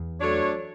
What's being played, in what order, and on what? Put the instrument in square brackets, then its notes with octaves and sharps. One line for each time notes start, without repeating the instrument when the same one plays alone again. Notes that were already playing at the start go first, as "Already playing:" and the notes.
Already playing: [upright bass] E2
[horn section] F#3 A3 D4 A4 C#5